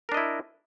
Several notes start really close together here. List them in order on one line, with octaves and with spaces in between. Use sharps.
A#4 D4 D#5 E4